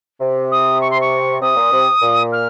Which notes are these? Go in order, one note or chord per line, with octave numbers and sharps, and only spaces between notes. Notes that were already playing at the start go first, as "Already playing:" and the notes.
C3
D#6
C#6
C6
C#6
C3 D#6
A#2
C3
A#2
F6